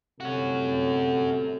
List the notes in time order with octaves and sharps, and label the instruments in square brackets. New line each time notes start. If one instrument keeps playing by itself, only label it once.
[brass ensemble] G1 A2 A4 [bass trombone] C3 [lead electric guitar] C#4 F#4